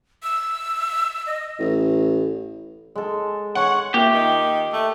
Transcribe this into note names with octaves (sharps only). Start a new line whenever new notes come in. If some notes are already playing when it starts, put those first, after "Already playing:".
E6
D#5
A1
G#3 A4
C#5 F#5 G#5 C#6
A#3 F4 G4 E5
D#3
A3